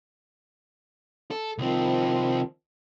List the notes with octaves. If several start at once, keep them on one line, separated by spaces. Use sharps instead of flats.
A4
C2 D#3 F3 C4